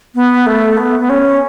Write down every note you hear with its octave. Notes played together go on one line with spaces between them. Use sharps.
B3
A3
B3
B3
C#4